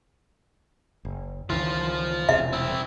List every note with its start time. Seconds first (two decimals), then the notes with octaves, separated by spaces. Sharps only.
1.05 F#1
1.50 C#2 D#3 E3 F4 C5
2.29 E1 C3 E5
2.53 C4 E4